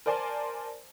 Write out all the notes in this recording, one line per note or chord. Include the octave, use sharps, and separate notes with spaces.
A#4 C5 D5 G#5 A5 C6